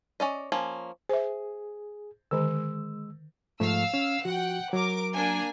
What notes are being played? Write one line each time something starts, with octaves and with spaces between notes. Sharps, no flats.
C#4 D5 D#5
F3 A#3 C#4
G#4 C5 E5
D3 D#3 G#3 E6
G#2 F3 A3 F5 E6
C#4
F3 F#4 F#5 G5
F#3 A#4 D6
A#3 D4 G#5